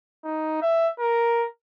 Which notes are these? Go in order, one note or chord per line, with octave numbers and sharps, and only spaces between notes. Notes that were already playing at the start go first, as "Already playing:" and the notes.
D#4
E5
A#4